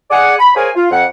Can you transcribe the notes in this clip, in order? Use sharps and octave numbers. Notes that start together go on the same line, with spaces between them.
G#4 D5 F#5
B5
G#4 A#4 C5 C#5 F5 G#5
F4
F2 F#5